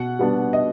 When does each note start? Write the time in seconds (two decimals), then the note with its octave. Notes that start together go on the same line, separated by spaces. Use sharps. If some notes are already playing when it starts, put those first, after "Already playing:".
Already playing: B2 F#5
0.19 G3 B3 D4
0.53 D#5